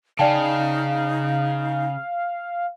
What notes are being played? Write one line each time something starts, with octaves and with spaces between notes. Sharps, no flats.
C#3 D#4 D5 F5 G5 A5